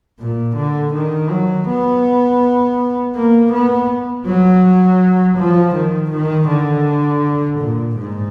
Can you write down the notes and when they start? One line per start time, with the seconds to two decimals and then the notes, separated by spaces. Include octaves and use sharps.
0.19 A#2
0.57 D3
0.94 D#3
1.30 F#3
1.67 B3
3.15 A#3
3.53 B3
4.26 F#3
5.38 F3
5.75 D#3
6.11 D#3
6.48 D3
7.59 A#2
7.97 G#2